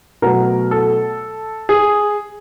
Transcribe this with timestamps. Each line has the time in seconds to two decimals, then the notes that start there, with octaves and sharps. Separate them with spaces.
0.22 B2 F#3 A3 A#4
0.71 A4
1.69 G#4